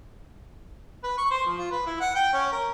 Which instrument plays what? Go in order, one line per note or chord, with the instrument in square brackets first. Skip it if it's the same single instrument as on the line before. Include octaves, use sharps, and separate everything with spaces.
[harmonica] B4
C#6
C5
F3
F4
B4
E4
F#5
G5
C#4
A#4